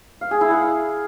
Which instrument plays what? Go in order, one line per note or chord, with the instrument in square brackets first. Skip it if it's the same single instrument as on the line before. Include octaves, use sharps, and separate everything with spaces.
[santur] F5
G#4
E4
F#5
F5